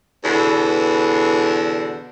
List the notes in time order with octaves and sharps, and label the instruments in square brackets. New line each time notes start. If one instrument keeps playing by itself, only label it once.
[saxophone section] E2 B2 D3